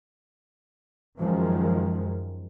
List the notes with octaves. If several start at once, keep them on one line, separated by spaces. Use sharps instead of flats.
F#2 D#3 F3 G#3